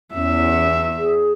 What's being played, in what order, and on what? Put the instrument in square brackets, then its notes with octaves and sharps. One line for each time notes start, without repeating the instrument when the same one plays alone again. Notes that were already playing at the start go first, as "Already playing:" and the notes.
[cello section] E2 [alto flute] C#4 [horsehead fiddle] E5
[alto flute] G#4